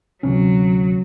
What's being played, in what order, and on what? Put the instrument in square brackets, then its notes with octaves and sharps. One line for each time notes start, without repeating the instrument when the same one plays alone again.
[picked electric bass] D2 C3 C#4 [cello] F#3